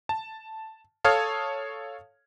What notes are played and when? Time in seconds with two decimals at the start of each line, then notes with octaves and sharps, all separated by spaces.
0.09 A5
1.05 A4 C#5 F5 D#6 F6 G#6